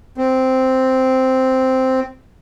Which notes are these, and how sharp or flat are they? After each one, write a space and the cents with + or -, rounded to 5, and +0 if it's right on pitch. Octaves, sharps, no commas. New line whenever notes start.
C4 -5